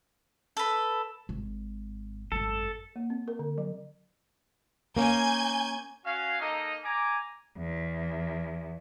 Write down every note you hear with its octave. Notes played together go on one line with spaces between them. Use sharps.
A4 B4
G#1
G#1 F#2 A4
A#3
C4
A#4
D3
F#3
A#3 C#4 G#5 G6 G#6
C#4 F#4 F5
A#3 D#4 A4 D#5
G#5 A#5 D6
E2